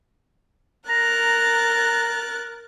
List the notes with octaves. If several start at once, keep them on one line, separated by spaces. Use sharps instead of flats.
A#4 A#5 F#6 A6